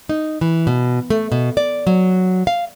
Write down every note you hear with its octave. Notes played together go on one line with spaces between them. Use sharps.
D#4
E3
B2
A3
B2
D5
F#3
F5